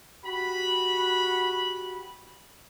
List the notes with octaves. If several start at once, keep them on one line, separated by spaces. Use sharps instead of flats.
F#4 G4 B5